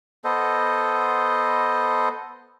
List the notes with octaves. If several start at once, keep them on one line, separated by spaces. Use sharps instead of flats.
B3 A4 C5 D#5